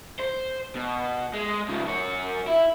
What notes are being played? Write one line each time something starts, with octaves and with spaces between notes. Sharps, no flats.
C5
B2
G#3
C#3 F3
F#2 C#5
E4